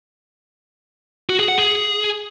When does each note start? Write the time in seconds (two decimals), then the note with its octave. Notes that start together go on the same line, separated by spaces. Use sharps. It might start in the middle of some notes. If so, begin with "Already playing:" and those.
1.30 F#4
1.39 G#4
1.48 F#5
1.58 G#4